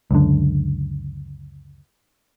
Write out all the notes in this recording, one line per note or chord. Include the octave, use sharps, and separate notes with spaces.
C#2 F#2 D3